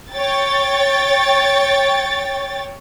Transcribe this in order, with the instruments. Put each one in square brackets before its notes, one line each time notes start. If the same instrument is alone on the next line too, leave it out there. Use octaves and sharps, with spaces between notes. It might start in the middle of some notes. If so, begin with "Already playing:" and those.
[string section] C#5 G5 A6